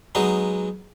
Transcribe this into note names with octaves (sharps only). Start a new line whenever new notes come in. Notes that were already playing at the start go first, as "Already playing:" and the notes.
F#3 G#3 B3 D#4